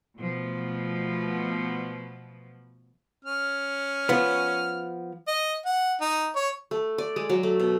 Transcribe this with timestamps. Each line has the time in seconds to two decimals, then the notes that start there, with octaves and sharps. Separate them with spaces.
0.18 B2 F3 A3
3.25 C#4 F6
4.09 F3 B3
5.27 D#5
5.65 F#5
6.01 D#4
6.36 C#5
6.71 A3
6.98 D5
7.16 G#3
7.30 F#3
7.43 A3
7.60 B2